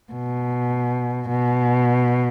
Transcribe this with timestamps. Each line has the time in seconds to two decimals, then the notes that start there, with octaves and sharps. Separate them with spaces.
0.13 B2
1.29 B2